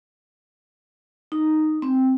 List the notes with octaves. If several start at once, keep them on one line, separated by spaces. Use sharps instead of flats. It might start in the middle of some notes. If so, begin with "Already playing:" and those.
D#4
C4